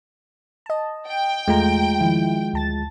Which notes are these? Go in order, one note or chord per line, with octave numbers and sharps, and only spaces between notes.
D#5 A5
G5
E2 G#3 A3 F4 A#5
D#3 F3 E4
D2 A5 A6